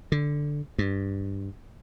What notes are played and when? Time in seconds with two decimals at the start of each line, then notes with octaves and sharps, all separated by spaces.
0.12 D3
0.79 G2